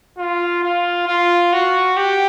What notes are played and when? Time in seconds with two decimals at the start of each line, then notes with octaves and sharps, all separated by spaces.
0.18 F4
0.63 F4
1.08 F4
1.53 F#4
1.97 G4